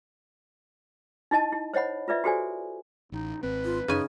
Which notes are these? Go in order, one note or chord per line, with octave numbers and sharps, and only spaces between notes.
D#4 E4 D#5 A5
E4
C5 C#5 D#5 F#5 B5
F4 B4 D5 E5
F#4 G4 A4 C5 D5 G#5
A1 D#4
G#1 C4 B4
F4
F#2 C#3 D#4 G#5